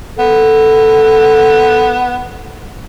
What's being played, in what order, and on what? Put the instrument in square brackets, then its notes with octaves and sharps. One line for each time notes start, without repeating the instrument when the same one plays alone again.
[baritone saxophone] B3 [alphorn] A4